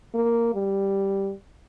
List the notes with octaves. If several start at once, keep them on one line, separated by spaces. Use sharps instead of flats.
A#3
G3